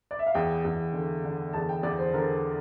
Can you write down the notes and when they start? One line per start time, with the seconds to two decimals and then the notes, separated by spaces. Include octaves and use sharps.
0.11 D5
0.19 E5
0.27 F5
0.35 E2 G5
0.65 E2
0.94 D3
1.24 D3
1.53 E2 A5
1.69 G5
1.83 E2 D5
1.98 C5
2.13 D3 A#4